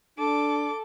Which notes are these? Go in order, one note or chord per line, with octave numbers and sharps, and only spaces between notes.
D4 A4 D6